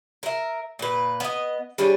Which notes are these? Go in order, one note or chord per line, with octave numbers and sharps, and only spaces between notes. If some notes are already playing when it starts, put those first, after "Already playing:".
A#4 E5
A#2 B4
B3 D#5
G3 D4 G#4 C#5